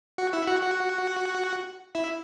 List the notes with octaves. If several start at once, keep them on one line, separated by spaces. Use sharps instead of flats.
F#4 F#5
E4 E5
F#4 F#5
F#4 F#5
E4 E5